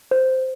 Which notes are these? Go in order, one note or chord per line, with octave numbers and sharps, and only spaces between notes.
C5